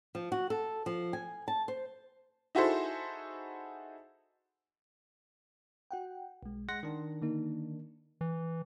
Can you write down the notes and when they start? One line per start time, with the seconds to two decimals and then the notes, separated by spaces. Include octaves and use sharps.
0.15 F3
0.32 F#4
0.50 A4
0.86 F3
1.13 G#5
1.48 A5
1.68 C5
2.55 D#4 E4 F#4 G#4 A4 C5
5.91 F#4 F#5 G5
6.43 B1 G#3
6.69 G#3 F#5 C6 A#6
6.83 D#3 D4
7.22 D3 A#3 D#4
8.21 E3